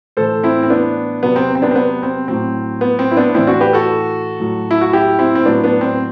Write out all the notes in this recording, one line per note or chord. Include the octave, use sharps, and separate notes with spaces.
A2 E3 A4 C5
C4 E4
C4
B3 D4
C3 F#3 B3
C4
C4
B3 D4
C4
B3
C4
A2 F#3 C4
B3
C4
E4
B3 D4
A2 E3 C4 E4
D4 F#4
G4 B4
F#4 A4
A2 F#3
E4
F#4
E4 G4
C4 E4
C4
A2 F#3 B3 D4
B3 D4
C4